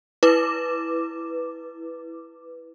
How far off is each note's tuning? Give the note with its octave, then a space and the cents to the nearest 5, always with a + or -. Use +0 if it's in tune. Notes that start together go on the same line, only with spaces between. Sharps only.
E4 +0 B4 +0 D6 +0